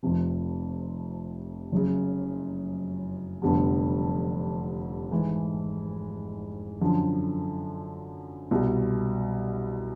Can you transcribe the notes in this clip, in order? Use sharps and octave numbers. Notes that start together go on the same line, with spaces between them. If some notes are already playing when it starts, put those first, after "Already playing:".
F1 F2 C3 F3
F#1 F#2 C#3
F1 F2 D3 G3 B3
G#1 G#2 E3 G#3
F#2 D3 F3
C2 B2 G3